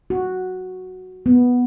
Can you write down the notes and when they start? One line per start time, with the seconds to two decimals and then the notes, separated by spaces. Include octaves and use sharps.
0.10 F#4
1.26 B3